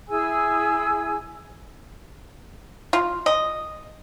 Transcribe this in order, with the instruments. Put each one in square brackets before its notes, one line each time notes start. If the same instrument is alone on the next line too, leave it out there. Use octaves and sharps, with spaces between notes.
[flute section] E4 G#4 G#5 E6
[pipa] F4
D#5